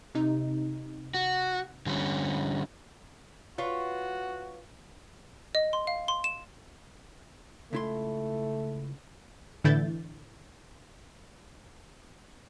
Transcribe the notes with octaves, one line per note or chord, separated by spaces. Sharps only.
C3 D#4
F#4
D3 G3 C#4
F4 F#4 B4 C#5
D#5
C6
F5
C6
E7
C#2 A3 E4 C6
A2 D3 E3 E4 G6 A6